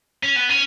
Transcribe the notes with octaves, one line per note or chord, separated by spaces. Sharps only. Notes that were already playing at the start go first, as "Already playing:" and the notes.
C#4
B3
C#4